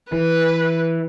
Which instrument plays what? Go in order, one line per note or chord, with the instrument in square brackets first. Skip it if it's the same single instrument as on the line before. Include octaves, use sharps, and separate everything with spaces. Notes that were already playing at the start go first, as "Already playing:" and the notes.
[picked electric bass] E3 [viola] B4